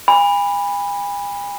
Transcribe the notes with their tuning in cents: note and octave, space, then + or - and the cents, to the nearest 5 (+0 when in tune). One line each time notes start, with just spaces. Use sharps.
G#5 -40 B5 +0